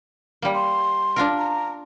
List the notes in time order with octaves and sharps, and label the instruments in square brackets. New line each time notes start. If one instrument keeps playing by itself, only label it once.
[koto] G3 A#3
[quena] C6
[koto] D4 F4 A#4
[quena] A#5